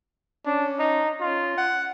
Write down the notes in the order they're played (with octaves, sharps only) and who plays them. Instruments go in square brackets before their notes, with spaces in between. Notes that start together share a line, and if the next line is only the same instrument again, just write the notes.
[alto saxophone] C#4 [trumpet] D4
[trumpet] D#4
[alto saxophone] C#4 [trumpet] F4
[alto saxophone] F#5